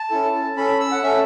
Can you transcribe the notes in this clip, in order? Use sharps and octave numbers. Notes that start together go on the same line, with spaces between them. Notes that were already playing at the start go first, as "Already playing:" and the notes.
Already playing: A5
C#4 E4 A4
C#4 A4 B5
E6
F#5
C#4 A4 E5